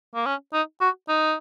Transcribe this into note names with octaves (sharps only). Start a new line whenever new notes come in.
A#3
C#4
D#4
F#4
D#4